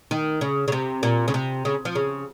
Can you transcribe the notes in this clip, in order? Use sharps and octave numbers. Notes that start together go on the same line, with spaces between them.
D#3
C#3
C#3
C3
A#2
C#3
C3
C#3
F3
C#3